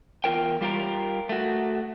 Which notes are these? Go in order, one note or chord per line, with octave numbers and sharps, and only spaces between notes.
E2 G#2 F4 A#4 G5
G3 F4 G4 A#4
A3 F#4